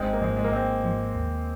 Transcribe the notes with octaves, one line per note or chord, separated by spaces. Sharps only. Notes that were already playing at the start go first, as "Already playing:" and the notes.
Already playing: G#1 G#3 C4
A#3
G#2 F3 G#3 C4
G#3
A#3
G#1 G#3 C4
G#2 F3
D#2